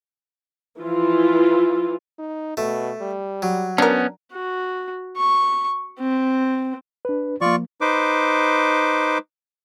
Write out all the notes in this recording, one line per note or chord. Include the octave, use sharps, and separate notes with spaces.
E3 F3 E4 F4
D#4
B2 A3
G3
F#3
B3 C#4 D4 A#4
F#4
C#6
C4
D4 B4
F3 A#3 F4 D5 C#6
D#4 B4 C5 D6